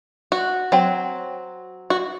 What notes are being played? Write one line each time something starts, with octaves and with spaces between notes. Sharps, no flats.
F#4
F#3 C4
F#4